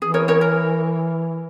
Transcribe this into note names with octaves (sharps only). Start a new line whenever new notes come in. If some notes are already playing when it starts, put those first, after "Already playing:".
E3 G#4
A#4 C#5
A#4 C#5
A#4